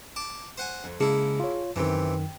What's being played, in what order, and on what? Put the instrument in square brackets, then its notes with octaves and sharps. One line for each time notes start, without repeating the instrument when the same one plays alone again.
[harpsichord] A5 D6
C5 F#5 G#5
[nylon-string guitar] F2
[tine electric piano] C#3 G#3 C#7 [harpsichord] A#3 E4 [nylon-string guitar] G#4 A5
[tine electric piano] F4 C#5
[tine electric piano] F#2 D#3 [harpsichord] C3 E3 [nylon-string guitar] G5 A5